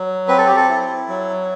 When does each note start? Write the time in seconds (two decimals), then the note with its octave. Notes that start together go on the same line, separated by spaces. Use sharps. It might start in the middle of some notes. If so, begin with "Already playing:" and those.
Already playing: F#3
0.28 C4 B4
0.38 A4
0.47 G4
0.56 A4
0.69 E4
1.09 F#3